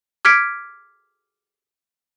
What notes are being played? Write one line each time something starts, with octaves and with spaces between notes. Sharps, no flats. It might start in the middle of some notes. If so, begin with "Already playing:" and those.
D6 F6 G#6 B6 C#7 D7